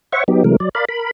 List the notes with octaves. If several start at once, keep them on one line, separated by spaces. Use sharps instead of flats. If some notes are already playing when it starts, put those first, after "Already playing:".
C5 C#5 E5 F#5 C#6
F#3 B3 D#4 G4
C3 E3 F#3 G#3 A3 A#4
F#3 D5
A#4 D5 F5 B5
A#4 B5